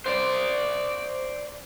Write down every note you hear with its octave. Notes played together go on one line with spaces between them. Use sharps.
C5 D5